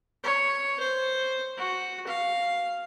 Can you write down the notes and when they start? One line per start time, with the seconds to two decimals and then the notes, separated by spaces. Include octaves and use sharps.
0.23 C#5
0.79 C5
1.58 F#4
2.07 F5